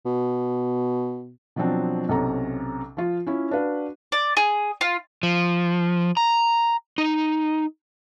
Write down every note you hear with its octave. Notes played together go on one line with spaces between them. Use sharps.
B2
B2 F3 F#3 C4 D4
B1 C3 C#4 A4 A#5
F3 F4
C#4 E4 F4
D4 F#4 B4 F5
D5
G#4
F4
F3
A#5
D#4